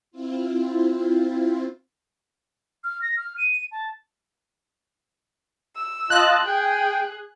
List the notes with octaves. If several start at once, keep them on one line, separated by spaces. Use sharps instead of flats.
C4 E4 F4
F6
A#6
F6
D#7
A5
E6
F4 D#5 A5 F#6
G#4 G5